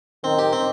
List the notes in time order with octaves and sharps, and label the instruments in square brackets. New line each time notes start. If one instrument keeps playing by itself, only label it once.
[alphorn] D#3 [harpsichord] C4
[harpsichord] G4
C4